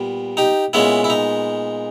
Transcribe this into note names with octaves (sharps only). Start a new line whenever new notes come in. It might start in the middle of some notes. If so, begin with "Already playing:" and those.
Already playing: A#2 G3 B3
D#4 G4
A#2 G#3 B3 C#4 E4
E4
D#4